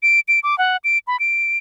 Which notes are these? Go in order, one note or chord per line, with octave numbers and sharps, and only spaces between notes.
D7
D7
D6
F#5
D7
B5
D7